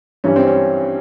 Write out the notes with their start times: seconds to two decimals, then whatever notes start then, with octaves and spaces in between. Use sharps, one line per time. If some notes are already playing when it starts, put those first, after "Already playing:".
0.24 G2 E3 G3 C#4
0.36 C4
0.48 C#4